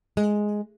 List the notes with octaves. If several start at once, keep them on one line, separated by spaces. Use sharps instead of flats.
G#3